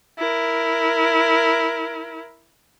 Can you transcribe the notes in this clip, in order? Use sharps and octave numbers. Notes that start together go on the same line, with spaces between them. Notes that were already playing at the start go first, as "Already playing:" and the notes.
E4 A#4